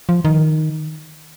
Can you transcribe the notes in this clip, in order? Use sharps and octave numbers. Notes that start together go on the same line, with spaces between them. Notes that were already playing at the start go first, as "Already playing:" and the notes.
F3
D#3